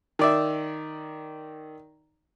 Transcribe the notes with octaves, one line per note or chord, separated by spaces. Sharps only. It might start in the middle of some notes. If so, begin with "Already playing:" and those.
D#3 D5 E5